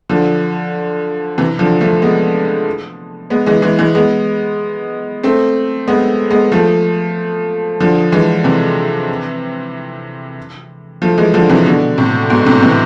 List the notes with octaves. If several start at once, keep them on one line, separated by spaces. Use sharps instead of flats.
D3 F3
C3 E3
D3 F3
F3 A3
G#3 B3
G#3 B3
E3 G#3
E3 G#3
E3 G#3
G#3 B3
A3 C4
G#3 B3
G#3 B3
F3 A3
D3 F3
E3 G#3
C3 E3
F3 A3
E3 G#3
D3 F3
C3 E3
B2 D3
A2 C3
G#2 B2
A2 C3
C3 E3